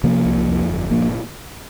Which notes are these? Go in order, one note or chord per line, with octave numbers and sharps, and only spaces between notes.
C3 F3 A#3
C2
F2
G1
A#2 F3 A#3